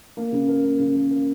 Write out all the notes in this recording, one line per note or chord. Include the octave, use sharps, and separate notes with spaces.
A#3
C#3
A#4
A#3
C#3
A#3
A#4